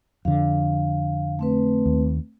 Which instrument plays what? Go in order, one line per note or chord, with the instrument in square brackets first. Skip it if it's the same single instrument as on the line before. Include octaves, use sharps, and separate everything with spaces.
[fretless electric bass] F2 D3 [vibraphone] F5
[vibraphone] A3 C4 B4
[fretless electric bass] D#2